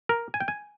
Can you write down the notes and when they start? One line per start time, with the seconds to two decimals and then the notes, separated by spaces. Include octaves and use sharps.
0.09 A#4
0.34 G#5
0.40 G5
0.48 G#5